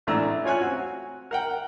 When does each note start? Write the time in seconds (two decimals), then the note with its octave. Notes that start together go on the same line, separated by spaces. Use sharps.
0.07 A1 G#2 A3 D4 A#5 E6
0.44 C#4 F4 C#5 G#5 F#6
0.60 C4 F#4
1.31 A#4 F#5 G5